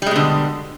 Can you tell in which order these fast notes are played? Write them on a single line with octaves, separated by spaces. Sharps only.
G3 G#3 B2 D3